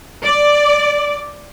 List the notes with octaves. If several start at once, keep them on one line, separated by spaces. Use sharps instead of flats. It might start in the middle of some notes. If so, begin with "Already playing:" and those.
D5